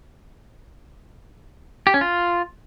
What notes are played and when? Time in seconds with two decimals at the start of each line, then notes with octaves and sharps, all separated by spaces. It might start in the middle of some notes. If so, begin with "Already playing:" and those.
1.87 G4
1.94 C#4
2.01 F4